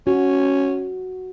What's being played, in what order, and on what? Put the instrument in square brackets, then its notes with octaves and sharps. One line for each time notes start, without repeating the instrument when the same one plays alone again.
[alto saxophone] C#4 [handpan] F#4